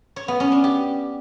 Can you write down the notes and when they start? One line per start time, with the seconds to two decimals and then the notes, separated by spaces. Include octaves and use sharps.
0.16 C#5
0.28 B3
0.40 C#4
0.52 D4
0.64 G4